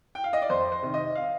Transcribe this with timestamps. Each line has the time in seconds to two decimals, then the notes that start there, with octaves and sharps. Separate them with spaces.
0.15 G5
0.24 F5
0.33 D#5
0.42 D5
0.50 F2 C5
0.72 C5
0.83 C3 D#3
0.94 D#5
1.15 F5